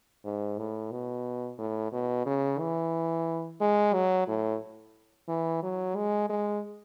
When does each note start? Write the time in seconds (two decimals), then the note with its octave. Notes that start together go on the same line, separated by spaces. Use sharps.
0.25 G#2
0.58 A2
0.91 B2
1.58 A2
1.92 B2
2.26 C#3
2.59 E3
3.61 G#3
3.94 F#3
4.28 A2
5.28 E3
5.63 F#3
5.96 G#3
6.30 G#3